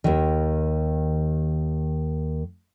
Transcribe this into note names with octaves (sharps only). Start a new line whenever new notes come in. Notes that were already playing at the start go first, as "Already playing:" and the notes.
D#2 D#3